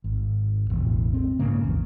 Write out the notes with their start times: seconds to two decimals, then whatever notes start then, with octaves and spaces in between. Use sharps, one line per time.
0.04 G#1
0.70 E1 A1
1.14 C4
1.39 B1 G#2 C#3 A#3
1.64 A#1 E2